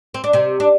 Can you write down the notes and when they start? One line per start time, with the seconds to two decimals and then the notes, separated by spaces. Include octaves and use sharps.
0.14 C4
0.24 D4
0.33 C3 C4
0.60 D4